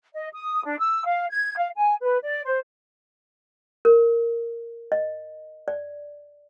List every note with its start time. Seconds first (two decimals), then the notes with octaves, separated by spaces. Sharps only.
0.15 D#5
0.33 D#6
0.65 D4
0.78 E6
1.06 F5
1.31 G#6
1.58 F5
1.76 G#5
2.01 B4
2.23 D5
2.45 C5
3.85 A#4
4.92 D#5
5.68 D5